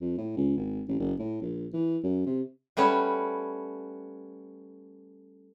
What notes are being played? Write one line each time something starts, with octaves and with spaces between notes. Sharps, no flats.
F2
A2
C#2
G#1
A1
F#1
A2
A#1
E3
F#2
C3
G3 A3 B3 C#4 C#5